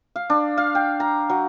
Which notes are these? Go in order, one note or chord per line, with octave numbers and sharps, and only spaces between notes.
F5
D4
F5
G5
A#5
F#3